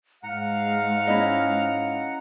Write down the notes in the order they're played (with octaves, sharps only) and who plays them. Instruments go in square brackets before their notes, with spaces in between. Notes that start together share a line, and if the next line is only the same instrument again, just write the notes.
[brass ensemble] G#2 F5 [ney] G#3 [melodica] F#5 A#5
[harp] C#4 E4 D#5